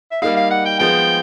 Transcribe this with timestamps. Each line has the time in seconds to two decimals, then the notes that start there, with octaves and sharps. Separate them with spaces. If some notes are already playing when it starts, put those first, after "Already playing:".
0.11 E5
0.22 G3 A#3 D#4 F5
0.37 F5
0.51 F#5
0.65 G5
0.79 F3 G#3 B3 G5